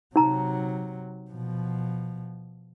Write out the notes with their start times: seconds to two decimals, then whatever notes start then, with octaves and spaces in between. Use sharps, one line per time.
0.16 C3 F#3 D#4 A#5
1.31 B2 F3